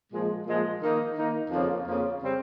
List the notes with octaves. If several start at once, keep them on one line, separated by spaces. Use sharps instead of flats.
A#2 F3 G#3
A#2 F3 G#3
D#3 A#3 D#4
D#3 A#3 D#4
F2 C#3 F3 A#3
F2 C#3 F3 A#3
C#3 G3 C4